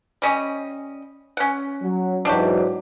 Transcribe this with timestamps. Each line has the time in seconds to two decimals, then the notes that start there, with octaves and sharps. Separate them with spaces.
0.22 G3 C#4 D#5
1.37 C#4 F#5
1.82 F#3
2.25 G#2 E3 F#3 D4 F#4 G4